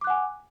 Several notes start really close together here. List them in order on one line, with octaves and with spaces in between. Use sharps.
D6 F#6 F#5 G#5